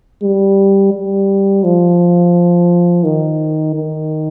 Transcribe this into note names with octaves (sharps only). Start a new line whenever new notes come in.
G3
G3
F3
D#3
D#3